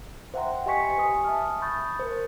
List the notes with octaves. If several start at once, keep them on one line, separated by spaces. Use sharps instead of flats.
C5 E5 F#5 G5 A#5 C6
G4 D#5 G#5 C#6 B6 C#7
B4 G#5 D#6
E5 A5 D#6 F6
B5 C#6 D#6 G6 A6
A#4 C5